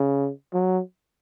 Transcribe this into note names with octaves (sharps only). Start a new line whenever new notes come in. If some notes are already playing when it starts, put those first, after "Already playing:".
Already playing: C#3
F#3